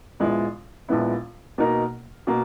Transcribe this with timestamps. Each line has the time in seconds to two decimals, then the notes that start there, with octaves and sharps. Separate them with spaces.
0.20 A#1 A#2 G#3 B3 E4
0.88 A#1 A#2 G#3 B3 E4
1.58 B2 A#3 D#4 A#4
2.27 B2 A#3